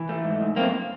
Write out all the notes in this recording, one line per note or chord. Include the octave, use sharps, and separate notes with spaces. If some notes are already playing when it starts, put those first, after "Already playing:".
Already playing: E3
A3
G#2
G#2
F#2 A#3 C4